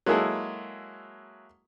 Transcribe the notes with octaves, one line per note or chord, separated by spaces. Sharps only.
F#3 G#3 A#3 E4 G#4 A4